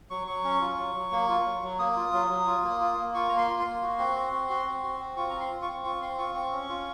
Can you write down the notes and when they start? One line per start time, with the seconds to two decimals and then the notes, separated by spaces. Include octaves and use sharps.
0.10 F#3 C#6
0.27 F#3 C#6
0.44 C#4
0.61 F4
0.79 F#3
0.95 F#3
1.11 A#3
1.29 F4
1.45 F#3
1.62 F#3
1.79 A#3 D#6
1.96 F4
2.13 F#3
2.30 F#3
2.47 F4
2.63 A#3
2.81 F4
2.97 A#3
3.14 F4 C#6
3.29 A#3 A#5
3.37 C6
3.48 F4
3.60 C6
3.65 A#3
3.82 F#4
3.98 C4
4.16 F#4
4.33 C4
4.49 F#4
4.66 C4
4.83 F#4
5.00 C4
5.17 F4 C#6
5.30 C4 A#5
5.39 C6
5.50 F4
5.62 C#6
5.67 C4
5.84 F4 C#6
6.01 C4 C6
6.18 F4 C#6
6.34 C4 C#6
6.52 C#4
6.69 F4